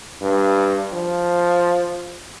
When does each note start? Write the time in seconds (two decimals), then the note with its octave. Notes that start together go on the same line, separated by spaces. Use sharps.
0.21 G2
0.93 F3